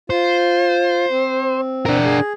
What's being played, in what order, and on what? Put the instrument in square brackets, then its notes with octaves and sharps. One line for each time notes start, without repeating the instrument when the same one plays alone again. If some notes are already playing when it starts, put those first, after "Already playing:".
[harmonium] F4 [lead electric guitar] C5
[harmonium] C4
[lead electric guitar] D4 A#4
[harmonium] G#4